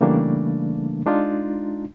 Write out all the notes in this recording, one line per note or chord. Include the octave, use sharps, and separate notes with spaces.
C#3 E3 G3 A3 A#3 D4
G#3 D4 D#4 F4